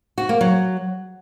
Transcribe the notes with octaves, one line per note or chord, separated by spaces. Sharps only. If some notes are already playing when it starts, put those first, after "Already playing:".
F#4
A#3
F#3